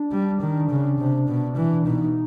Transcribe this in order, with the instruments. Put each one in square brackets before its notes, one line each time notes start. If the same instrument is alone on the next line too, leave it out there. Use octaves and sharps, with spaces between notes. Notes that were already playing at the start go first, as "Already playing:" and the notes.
Already playing: [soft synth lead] D4
[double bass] G3
D#3
C#3
C3
B2
E3
[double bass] B2 [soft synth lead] D#4